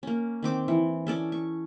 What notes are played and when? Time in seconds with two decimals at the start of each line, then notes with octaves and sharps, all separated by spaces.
0.03 A#3 C#4
0.43 D#3 C4 D6
0.68 E3
1.07 C#4 A4 D5
1.32 C#6